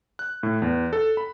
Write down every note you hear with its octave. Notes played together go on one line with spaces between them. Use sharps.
F#6
A2
E2
A4
B5